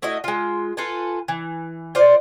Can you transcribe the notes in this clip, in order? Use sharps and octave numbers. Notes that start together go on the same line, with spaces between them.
A3 E4 F#4 D#5
G#3 F4
F4 A4 B4 G#5
E3
F4 C5 D5